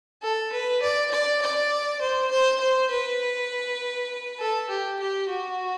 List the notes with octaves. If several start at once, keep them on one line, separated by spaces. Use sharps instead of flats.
A4
B4
D5
D5
D5
C5
C5
C5
B4
A4
G4
G4
F#4